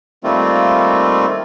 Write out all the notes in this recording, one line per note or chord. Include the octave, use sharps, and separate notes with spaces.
D#3 G3 A3 A#3 C4 F4